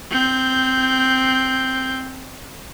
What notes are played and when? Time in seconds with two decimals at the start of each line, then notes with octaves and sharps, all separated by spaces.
0.11 C4 G6